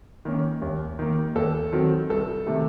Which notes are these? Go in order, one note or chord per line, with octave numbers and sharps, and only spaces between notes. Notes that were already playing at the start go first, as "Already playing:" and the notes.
D#3 A#3 C#4
D#2
D#3 A#3
D#2 A4
D#3 F#3 C4
C2 A4
C3 D#3 A3